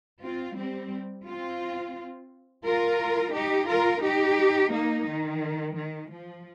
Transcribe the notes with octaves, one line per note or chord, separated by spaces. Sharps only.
C4 F4
G3 C4
C4 F4
F4 A#4
D#4 G4
F4 A#4
D#4 G4
A#3 D#4
D#3
D#3
F3